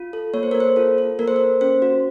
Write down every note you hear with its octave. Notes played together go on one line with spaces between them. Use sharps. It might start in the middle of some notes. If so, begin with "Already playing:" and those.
Already playing: F4
A4
A#3 C#5
C5
A#3 A#4
C5
F4 A4
A4
A#3 A#4
C5
A#4
A#3
C#4 C5
F#4